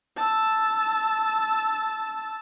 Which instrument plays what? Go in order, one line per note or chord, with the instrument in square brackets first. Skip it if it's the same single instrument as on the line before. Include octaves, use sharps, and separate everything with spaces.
[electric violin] A5 E6